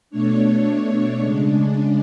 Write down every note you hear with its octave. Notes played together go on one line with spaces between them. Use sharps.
B2 A3 D4 C#5
C#3 G#3 D4